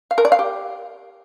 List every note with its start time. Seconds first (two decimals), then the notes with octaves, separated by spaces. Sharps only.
0.11 F5
0.18 A#4
0.25 D5
0.32 F5
0.39 G4